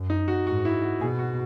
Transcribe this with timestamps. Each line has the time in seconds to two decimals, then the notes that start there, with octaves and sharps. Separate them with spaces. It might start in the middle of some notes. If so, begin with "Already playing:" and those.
Already playing: F#2
0.10 D#4
0.28 F#4
0.46 G#2 F#4
0.65 E4
0.82 F#4
1.01 B2 G#4
1.19 F#4